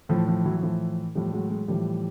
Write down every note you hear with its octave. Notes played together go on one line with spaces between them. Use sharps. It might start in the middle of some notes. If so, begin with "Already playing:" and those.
A2 E3 F3
F3
E3 F#3
F#3
A2 E3 F3
A2 E3 F3 G3
F#3 G#3
F#3 G#3
A2 E3 F3 G3